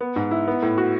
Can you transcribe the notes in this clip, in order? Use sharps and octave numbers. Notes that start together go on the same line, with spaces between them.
B3
G#2
E4
B3
A2
F#4